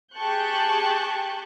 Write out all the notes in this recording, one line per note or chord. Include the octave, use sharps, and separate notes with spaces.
G4 G#4 A5 C#6 F#6 G6